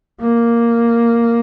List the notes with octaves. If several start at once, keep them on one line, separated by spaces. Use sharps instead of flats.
A#3